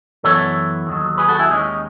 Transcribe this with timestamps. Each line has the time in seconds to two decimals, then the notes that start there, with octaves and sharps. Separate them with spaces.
0.23 F#2 E3 B3 A4 C#5
0.87 D#2 D#3 F#3
1.18 G#4 B4
1.29 F#4 A4
1.39 E4 G#4
1.50 D#2 D#3 G#3 C#4 D#4